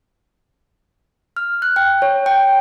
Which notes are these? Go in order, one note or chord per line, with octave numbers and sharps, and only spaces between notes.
F6
F#6
G5
C#5
G5